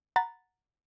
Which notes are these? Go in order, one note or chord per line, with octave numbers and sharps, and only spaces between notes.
F#5 A#5 B5 A6